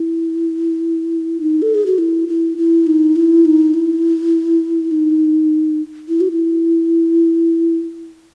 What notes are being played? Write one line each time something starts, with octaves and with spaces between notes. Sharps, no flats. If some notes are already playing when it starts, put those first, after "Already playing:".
Already playing: E4
D#4
A4
G#4
F#4
E4
E4
E4
D#4
E4
D#4
E4
D#4
E4
F#4
E4